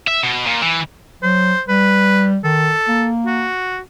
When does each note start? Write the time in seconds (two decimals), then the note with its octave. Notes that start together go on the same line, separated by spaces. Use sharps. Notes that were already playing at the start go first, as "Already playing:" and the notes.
0.08 E5
0.23 B2
0.46 A#2
0.62 E3
1.23 F#3 C5
1.68 G3 B4
2.44 D#3 A4
2.88 A#3
3.26 F#4